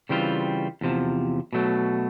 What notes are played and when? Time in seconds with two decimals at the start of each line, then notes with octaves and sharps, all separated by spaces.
0.09 C#3 E3 G3 C4 F4
0.81 E2 C3 F3
1.53 B2 F#3 A3